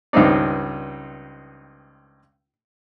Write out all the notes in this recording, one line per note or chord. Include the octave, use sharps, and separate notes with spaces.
C#2 G2 D#3 C4 D#4 D5